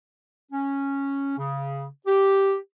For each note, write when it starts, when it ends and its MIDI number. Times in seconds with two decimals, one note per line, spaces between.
0.52 1.36 61
1.38 1.86 49
2.07 2.55 67